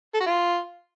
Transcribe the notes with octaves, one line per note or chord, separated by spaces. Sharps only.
A4
F#4
F4